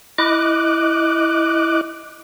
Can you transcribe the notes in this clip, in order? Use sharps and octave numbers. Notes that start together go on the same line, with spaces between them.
E4 D#5 D6 F#6